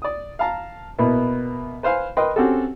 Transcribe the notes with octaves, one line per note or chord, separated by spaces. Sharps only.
D5 D#6
F5 A5 A#5
B2 A#3 B3 E4
B4 C5 F5 G#5
A#4 B4 D#5 G5 C6
C4 C#4 F#4 G4 A4